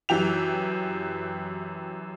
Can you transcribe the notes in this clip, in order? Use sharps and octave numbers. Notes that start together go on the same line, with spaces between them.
F#2 E3 G4 F7